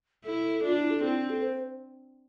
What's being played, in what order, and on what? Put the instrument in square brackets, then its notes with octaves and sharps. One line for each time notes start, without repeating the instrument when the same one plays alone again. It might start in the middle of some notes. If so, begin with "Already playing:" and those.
[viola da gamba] E4 [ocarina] A4
[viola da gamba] D4 [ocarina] F4
[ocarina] E4
A4
[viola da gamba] C4 [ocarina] E4
[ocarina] D4
A4
C5